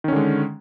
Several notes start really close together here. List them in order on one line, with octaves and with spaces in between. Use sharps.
D#3 C#4 D3 G#3